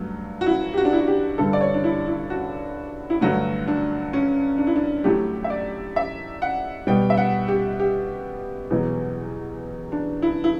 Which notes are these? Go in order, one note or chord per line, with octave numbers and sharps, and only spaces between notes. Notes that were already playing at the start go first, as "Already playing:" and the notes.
Already playing: G2 F#3 A3
F#4
E4
G4
F#4
D4
E4
F#4
G4
G2 D3 G3 A4
D5
C#5
D4
E4
E4
F#4
E4
G2 D3 F#3 A3 F#4
D4
C#4
D4
E4
D4
A2 F#3 A3 G4
E5
D5
E5
F#5
B2 G3 G5
E5
F#5
G4
G4
E2 B2 F#3
D4
E4
E4